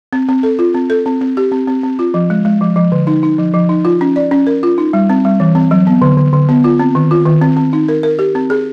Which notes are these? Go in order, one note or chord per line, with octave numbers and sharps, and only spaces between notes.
C4
C4
A4
F4
C4
A4
C4
C4
G4
C4
C4
C4
F4
F3
G#3
G#3
F3
F3
D3
D#4
D#4
F3
F3
D#4
F4
C#4
D5
C#4
A#4
F4
D#4
G3
C4
G3
E3
C4
F#3
B3
D3
D3
D3
B3
F4
C4
D#3
F4
D#3
C4
C4
D#4
A#4
A#4
G4
C4
G#4